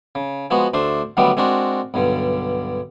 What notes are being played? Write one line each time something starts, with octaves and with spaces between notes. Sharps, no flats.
C#3
F3 G#3 B3 F#4
D2 A3 D4 C5
D3 D#3 F#3 G3 A3 B3
G#3 C4 D4 F#4 A#4
B1 G2 D3